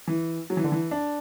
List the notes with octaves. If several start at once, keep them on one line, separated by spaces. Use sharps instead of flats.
E3
F#3
E3
D3
E3
D4